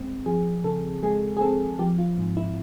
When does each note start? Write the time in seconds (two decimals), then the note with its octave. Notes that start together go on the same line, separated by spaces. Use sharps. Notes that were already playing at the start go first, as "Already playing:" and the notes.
Already playing: G2 G#3 C4
0.26 F3 G#4
0.64 C#3 A4
1.03 G#3 G#4
1.37 G#4
1.41 C4 A4
1.79 F3 G4
1.98 F4
2.18 G#2
2.37 E4